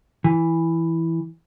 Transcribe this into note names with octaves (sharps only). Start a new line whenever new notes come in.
E3